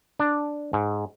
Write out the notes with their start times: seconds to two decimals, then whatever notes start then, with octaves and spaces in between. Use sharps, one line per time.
0.19 D4
0.73 G#2